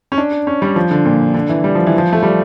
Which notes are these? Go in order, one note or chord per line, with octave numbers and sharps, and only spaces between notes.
C#4
D4
C#4
G3
F3
D3
A#2
D3
E3
G3
F3
E3
F3
A3
G3